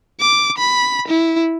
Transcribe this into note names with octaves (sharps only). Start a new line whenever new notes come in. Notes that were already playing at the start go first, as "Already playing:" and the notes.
D6
B5
E4